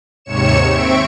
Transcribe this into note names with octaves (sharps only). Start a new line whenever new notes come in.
D#2 G#2 C3 C#5 C#7 E7
C4 E5 C#6 D7